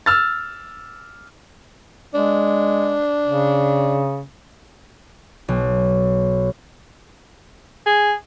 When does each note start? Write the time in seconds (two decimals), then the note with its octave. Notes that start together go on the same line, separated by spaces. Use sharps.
0.06 E6 F6 A6
2.14 G#3 D4
3.25 C#3
5.48 B1
7.86 G#4